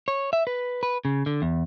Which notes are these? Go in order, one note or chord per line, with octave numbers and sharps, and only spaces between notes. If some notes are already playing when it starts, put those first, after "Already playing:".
C#5
E5
B4
B4
C#3
D3
E2